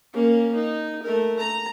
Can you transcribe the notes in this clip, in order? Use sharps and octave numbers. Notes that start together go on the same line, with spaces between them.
A#3 C#4
D#4
A3 A#4
A#5